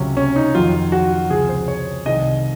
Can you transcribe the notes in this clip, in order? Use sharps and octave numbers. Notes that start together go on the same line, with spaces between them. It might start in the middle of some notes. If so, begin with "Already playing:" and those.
Already playing: C#2 C3 F#3 C#4
C#4
D#4
F2 D#3 F#3 F4
F#4
C#2 C3 F3 G#4
C5
C#5
C2 C3 D#3 D#5